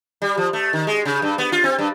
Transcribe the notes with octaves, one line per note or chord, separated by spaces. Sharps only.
G3
F3
A3
D#3
G#3
C#3
G2
B3
F4
C4
G2